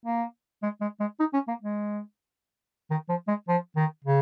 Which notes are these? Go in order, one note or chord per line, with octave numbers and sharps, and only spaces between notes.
A#3
G#3
G#3
G#3
D#4
C#4
A#3
G#3
D#3
F3
G#3
F3
D#3
C#3